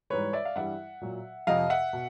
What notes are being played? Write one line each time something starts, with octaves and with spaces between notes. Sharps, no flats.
G#2 E3 G3 B4 C#5
D5 E5
F5
G2 E3 G3 E5 F#5
A#2 F#3
F2 C3 F3 D#5 F5
E5 F#5
B2